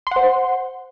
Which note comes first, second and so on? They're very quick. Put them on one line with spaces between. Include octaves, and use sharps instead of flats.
C6 F#5 C5